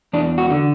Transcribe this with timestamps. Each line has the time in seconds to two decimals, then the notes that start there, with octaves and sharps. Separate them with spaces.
0.13 E2 D4
0.38 F#4
0.50 D3